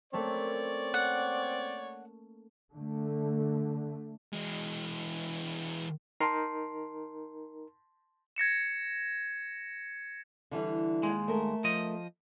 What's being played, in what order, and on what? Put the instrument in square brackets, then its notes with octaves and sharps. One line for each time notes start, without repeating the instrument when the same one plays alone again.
[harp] A3 A#3 C#4 [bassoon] C4 [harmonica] C#5 D5
[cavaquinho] F#5
[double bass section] D3 A3
[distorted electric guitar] E3 G#3
[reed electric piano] D#4 A#4 [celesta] A5 C6 C7
[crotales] G#6 A#6 C#7 E7
[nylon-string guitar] D3 E3 G3
[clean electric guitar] D#2 G#3
[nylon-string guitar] A3 A#4
[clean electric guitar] F3 D#5